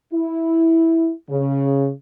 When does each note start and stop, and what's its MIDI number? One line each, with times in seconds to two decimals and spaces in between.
0.13 1.11 64
1.30 1.89 49